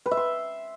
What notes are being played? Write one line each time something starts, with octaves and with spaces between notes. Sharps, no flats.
B4
E5
C6